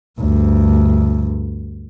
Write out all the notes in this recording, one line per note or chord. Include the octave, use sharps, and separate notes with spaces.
D2 G2